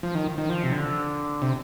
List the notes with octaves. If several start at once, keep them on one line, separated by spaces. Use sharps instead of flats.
F3
D#3
D#3
F3
C3
D3
C3